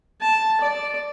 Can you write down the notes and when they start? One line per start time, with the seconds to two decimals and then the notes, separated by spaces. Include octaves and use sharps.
0.21 A5
0.61 D5